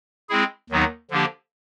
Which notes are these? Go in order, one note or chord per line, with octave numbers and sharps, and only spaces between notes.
G#3 C4 E4 G#4
D#2 D#3 F#3 B3 D#4
D3 F3 A#3 D4 G4